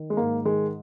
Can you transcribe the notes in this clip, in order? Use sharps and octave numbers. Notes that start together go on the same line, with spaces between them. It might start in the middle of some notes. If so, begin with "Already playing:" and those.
Already playing: D#3
G#3
G#2 A#3
D#3 G#3